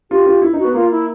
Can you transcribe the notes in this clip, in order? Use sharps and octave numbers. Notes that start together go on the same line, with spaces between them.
F4 G4
F4
E4
D#4
F#4
B3
A#3 F4
E4